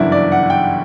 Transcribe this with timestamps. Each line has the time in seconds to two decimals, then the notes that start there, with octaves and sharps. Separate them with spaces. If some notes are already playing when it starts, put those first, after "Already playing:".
Already playing: G1 F#2 C#3 E3 D4 E4
0.12 D5
0.32 F#5
0.50 G5